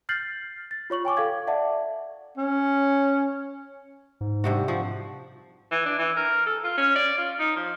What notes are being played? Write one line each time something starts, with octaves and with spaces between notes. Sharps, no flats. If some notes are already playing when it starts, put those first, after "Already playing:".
F6 G6 A6 C7 F#7
A6
F4 C#5 C#6 F#7
G5 G#5 C#6 D6
A4 F5 G#6
D5 E5 F#5 A5
C#4
G#2
G2 C3 F#4
F3 F#4
E3
D4
E3
A#4
A4
F4
C#4
D5
F4
D#4
F3